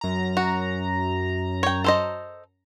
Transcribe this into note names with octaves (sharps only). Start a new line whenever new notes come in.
F#2 A#5
F#4
C#5 G5
A4 C5 D#5